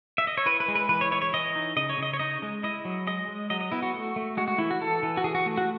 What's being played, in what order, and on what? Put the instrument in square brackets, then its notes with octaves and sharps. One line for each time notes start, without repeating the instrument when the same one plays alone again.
[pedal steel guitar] E5
D#5
C#5
E4 B4
B4
G#3
B4
E3 B4
C#5
E4 C#5
C#5
E3 D#5
D#4
C#3 D#5
C#5
C#3 D#5
C#5
D#4 D#5
G#3
E4 D#5
F#3
G#3 D#5
G#3
F#3 D#5
D#5
B3 E4
F#4
A3
A3
G#3 F#4
F#4
E3 E4
F#4
E3 A4
E3
F#4
E3 G#4
F#4
A3
F#4